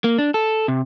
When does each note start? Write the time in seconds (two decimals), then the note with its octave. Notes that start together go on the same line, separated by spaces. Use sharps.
0.04 A#3
0.19 D4
0.34 A4
0.68 C3